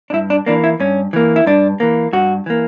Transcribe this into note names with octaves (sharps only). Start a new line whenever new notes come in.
D4
G2 E4
D4
E3 A#3 D4
E4
G2 C#4
E3 A#3
E4
G2 D4
E3 A#3
G2 F#4
E3 A#3